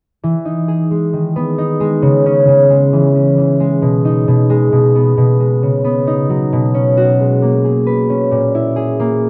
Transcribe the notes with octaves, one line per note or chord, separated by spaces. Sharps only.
E3
D#4
G#4
G#3
D#3
B3
D#4
G#3
C#3
C#4
C#3
G#3
E3
C#4
E3
G#3
B2
D#4
B2
G#3
B2
B3
B2
G#3
C#3
B3
D#4
F#3
B2
C#4
F#4
G#3
A#3
G#4
B4
C#4
A#2
E4
G#4
A#3